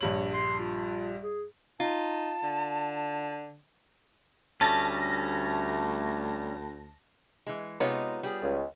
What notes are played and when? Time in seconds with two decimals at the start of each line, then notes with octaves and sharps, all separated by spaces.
0.01 A#1 G2 C#5 F#7
0.34 C6
0.59 F4
1.22 G#4
1.80 D#4 F4 A5
2.43 D3
4.61 D2 G3 A3 C#4 A5 A#6
7.47 E3 G#3
7.80 C3 G#3 B3 D#4 F4 C#5
8.23 G3 G#4
8.42 C#2